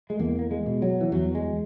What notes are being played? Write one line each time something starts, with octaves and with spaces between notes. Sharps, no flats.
G#3
E2 A#3
A#3
G#3
B2
F#3
E3
E2 F#3
G#3